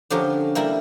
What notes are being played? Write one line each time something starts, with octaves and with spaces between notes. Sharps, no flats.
D3 F3 C#4 G4 A#4
G3 A#3 E4 A#4